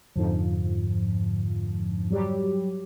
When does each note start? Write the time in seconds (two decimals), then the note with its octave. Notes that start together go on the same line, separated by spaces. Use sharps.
0.16 F2 G#2 D3 F3
2.10 F#3 G3 G4